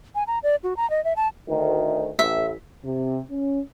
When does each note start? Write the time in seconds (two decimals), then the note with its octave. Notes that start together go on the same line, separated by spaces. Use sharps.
0.15 G#5
0.27 A#5
0.43 D5
0.64 F#4
0.77 A#5
0.90 D#5
1.04 E5
1.16 A5
1.49 D2 D#3
2.19 A1 E5
2.85 C3
3.30 C#4